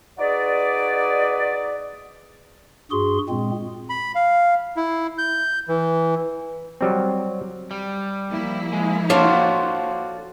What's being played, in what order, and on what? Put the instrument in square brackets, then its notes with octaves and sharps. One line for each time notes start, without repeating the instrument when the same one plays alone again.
[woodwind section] D#4 F#4 G#4 B4 D5
[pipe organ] G2 F#4 G#4 C6
A#2 G#3 C4
[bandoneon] B5
F5
E4
G6
E3
[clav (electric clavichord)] F#3 G3 C4
[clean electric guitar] G3
[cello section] F3 A#3 E4
[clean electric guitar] G#3
[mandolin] D4 F4 C5 [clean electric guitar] F#4 A4 F5 [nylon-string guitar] C#5